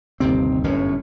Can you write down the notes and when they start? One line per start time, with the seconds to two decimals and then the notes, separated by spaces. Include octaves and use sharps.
0.20 G1 D#2 C3 C4
0.64 G1 F#2 A2 C#4